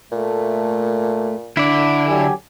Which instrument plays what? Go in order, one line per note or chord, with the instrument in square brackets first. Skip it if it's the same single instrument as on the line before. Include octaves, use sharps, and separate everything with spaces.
[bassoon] A#2 [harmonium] A3
[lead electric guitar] D3 [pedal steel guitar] E4 D5
[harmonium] F#3 G4 G#5